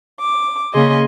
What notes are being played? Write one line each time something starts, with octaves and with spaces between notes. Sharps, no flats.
D6
C#3 A#3 C#4 G#4 D#5 C6